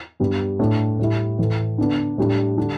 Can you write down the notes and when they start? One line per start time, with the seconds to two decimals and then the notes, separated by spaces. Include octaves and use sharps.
0.20 G2 G3 B3
0.59 A2 A3 D4
0.99 A2 G3 E4
1.39 A2 E3 A3
1.78 D3 B3 D4
2.18 A2 G3 D4
2.57 D3 G3 D4